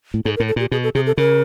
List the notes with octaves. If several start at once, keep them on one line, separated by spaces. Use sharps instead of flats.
A2
G#2 A4
A#4
A2
A4
A#2 G4
B2 G#4
A4
C3 G#4
A4
C#3 A#4